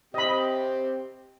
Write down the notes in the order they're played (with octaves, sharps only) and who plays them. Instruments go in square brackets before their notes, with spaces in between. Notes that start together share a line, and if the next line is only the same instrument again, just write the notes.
[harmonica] C4 G4 [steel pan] D#5 B5